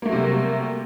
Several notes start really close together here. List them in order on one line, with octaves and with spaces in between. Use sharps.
A#3 A3 F#3 C3 G3